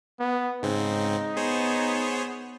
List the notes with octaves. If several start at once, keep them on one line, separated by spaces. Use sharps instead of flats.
B3
G#2 C#3 C4 D#4
B3 G#4 C5 C#5